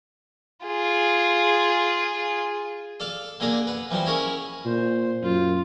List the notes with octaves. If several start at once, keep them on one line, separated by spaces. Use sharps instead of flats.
F4 G#4
A4 D5 F5 A5
D3 A#3 G#4 A#4 D5
B4 F#5
E3 F3 G3 C5
C#4 E4 G#4 A#4 C#5
A#2 C5
F#2 F4